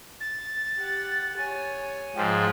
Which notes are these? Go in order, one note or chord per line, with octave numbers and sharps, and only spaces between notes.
A6
G4 F#5
C#5 G#5
G#2 F3 G5